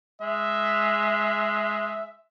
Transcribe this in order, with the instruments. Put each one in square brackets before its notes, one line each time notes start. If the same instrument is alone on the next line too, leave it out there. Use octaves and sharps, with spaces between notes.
[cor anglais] G#3 [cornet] E5